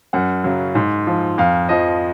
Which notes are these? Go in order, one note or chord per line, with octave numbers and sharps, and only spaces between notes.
F#2 F#5
C#3 F#3
G#2
F3
F2 F5
F3 D#5